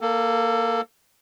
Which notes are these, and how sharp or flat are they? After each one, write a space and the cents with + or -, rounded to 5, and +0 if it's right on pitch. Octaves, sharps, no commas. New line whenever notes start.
A#3 +0 A4 +20